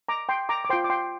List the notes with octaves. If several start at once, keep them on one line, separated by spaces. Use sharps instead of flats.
A#5 D6
G5 C6
A#5 D6
D6
F4 C5 G5 C6
D6
G5 C6